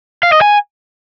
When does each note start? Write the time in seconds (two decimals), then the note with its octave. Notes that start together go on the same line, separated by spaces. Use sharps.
0.23 F5
0.32 D#5
0.41 G#5